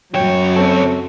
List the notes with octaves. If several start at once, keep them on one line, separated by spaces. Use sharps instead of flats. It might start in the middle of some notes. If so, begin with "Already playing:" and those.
C#2 F#2 F#3 C#5 G5
C4 A4